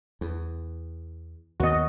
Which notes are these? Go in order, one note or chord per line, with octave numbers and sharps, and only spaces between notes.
E2
D#2 B3 F#4 D#5